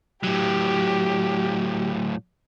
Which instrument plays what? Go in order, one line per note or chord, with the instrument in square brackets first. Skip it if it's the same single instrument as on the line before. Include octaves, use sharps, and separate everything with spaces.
[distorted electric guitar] A2 F#3 [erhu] G4